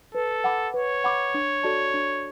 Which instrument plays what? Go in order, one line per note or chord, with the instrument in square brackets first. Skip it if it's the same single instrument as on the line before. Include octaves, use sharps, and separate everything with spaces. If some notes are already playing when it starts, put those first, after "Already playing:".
[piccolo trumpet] A4 [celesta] B4
[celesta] F#5 B5 D6
[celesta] B4 [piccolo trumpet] C#5
[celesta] F#5 B5 D6
D4
F#4 A4 D5 A5
D4